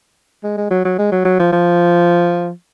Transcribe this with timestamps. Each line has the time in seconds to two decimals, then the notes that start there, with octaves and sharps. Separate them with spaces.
0.44 G#3
0.57 G#3
0.71 F#3
0.85 F#3
0.99 G#3
1.12 F#3
1.25 F#3
1.39 F3
1.52 F3